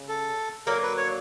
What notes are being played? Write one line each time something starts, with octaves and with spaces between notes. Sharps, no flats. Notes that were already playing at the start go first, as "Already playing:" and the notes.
Already playing: C#3
A4
D3 F#3 A#3 A#4
B4
C#5